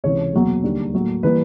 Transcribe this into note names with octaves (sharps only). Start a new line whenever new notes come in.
C#2 C3 E3 C#5
E2 B2 F#3 A#3
D#2 D3 G3 A#3
A2 F#3 A#3
E3 G3 A#3 B4